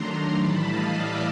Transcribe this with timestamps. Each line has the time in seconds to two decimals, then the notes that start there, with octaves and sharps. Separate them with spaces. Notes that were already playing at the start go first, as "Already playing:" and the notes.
Already playing: D#3 F#3 A3 D4 A#5 C6
0.36 A2 E3 G3 A5 B5
0.64 D#5 F5
0.92 D5 E5